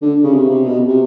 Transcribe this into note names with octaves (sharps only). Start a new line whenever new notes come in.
D3
C#3
C3
C3
B2
C3